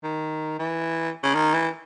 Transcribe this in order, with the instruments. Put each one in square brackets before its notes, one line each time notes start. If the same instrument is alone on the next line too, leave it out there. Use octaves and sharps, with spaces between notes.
[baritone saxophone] D#3
E3
C#3
D#3
E3